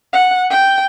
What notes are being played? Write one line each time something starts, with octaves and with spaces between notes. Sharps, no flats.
F#5
G5